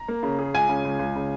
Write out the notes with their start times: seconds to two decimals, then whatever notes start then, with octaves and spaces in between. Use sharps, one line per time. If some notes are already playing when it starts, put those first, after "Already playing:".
Already playing: A#5
0.08 A#3
0.23 C#3
0.39 G#4
0.54 C#2 G#5
0.69 C#3
0.85 C#2
0.99 C#2
1.15 C#3